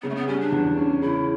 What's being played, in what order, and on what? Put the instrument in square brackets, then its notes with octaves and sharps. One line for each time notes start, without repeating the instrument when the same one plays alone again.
[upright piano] C#3 [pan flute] B3
[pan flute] A3
B3
[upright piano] G3 [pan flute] C#4
[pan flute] D4
[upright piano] E2
C#4
[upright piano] C#3 [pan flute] E4